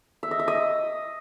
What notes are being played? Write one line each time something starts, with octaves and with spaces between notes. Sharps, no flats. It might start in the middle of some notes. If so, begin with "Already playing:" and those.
E5
D#5
E5
D#5